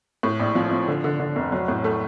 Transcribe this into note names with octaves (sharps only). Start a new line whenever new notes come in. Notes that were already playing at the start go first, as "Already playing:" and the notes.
A2
A#1
F3
F3
D3
D3
D3
F1
F#3
A2
A3